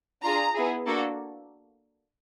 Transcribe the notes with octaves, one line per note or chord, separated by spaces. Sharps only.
D4 F4 G#4 A#5
B3 E4 G#4
A#3 D4 F#4 A4